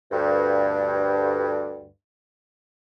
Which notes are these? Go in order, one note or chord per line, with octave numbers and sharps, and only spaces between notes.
D2 G2